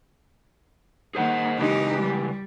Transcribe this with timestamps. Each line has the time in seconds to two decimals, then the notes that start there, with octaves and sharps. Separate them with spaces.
1.15 D#3 A#3 G#4 C5 F#5
1.58 C#3 E3 G#3 D#4 G4
2.01 G3